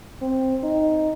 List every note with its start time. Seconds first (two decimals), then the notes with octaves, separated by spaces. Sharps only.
0.22 C4
0.64 D#4